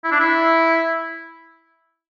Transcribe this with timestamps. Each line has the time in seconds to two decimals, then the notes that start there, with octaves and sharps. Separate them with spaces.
0.04 E4
0.12 D4
0.20 E4